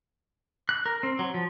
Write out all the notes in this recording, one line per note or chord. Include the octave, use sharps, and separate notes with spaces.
F#6
A#4
C4
F#3
F3